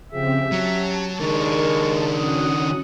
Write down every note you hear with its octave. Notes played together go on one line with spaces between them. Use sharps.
C#3 F3 C4 G4 G#4 E5
F#3 C#4 G4 A5
D#2 D#3 G#3 D4 A#4 C#6
C#4 F#4 F#5 D#6